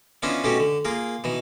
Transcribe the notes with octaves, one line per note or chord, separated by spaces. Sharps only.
B3 C#4 D4 E4 F4 D#5
B2 A3 C#4 D#4 F#4 G4
D3
A#3 F4 G#4 A#4
B2 E3 D#4